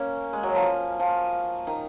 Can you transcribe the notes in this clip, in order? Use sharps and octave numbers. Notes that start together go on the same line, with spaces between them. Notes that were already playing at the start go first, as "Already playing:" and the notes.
Already playing: A#3 C#4
G#3
F#3
F3
F3
D#3